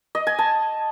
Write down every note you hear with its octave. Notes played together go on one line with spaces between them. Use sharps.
D#5
G#5
A5